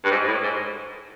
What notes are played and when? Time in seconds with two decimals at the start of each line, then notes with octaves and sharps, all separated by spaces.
0.05 G2
0.11 G#2
0.27 A2
0.43 G#2